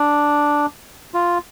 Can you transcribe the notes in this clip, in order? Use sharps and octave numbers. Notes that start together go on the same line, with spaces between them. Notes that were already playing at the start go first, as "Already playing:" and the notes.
Already playing: D4
F4